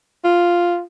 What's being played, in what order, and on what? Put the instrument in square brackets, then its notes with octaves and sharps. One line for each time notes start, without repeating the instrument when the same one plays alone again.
[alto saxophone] F4